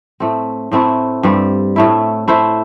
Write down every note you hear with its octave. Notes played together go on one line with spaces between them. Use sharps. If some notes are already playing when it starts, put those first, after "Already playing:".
A2 A3 C4
A2 A3 C4 E4
G2 G3 C4
A2 A3 E4
A3 E4 C5 E5